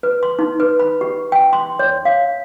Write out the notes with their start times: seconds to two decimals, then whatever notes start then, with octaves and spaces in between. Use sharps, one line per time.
0.03 B4
0.23 C6
0.39 D#4
0.60 B4
0.80 B5
1.01 G4
1.32 G5
1.53 C6
1.79 C#5
2.05 F5